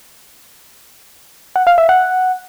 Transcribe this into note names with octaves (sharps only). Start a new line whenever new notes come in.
F#5
F5
E5
F#5